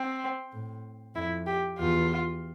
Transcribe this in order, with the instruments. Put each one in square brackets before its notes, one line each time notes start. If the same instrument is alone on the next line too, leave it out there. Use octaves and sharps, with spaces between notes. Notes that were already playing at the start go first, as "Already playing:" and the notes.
Already playing: [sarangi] C4
[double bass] A2
[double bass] F2 [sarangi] E4
[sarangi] G4
[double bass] E2 [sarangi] F4